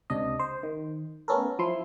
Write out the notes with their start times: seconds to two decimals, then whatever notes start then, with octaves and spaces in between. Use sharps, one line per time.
0.10 C#2 C3 D4 D#5
0.39 C5
0.63 D#3
1.28 A3 B3 C#4 A4 A#4
1.59 F3 E4 C6